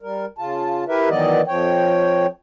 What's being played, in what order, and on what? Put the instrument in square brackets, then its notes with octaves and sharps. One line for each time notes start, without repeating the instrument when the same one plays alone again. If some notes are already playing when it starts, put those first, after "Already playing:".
[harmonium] G3 A#4
C#3 F4 A5
E4 G4 A#4 B4 E5
D#3 E3 F#3 B3 D5 D#5
F2 F3 C#5 G5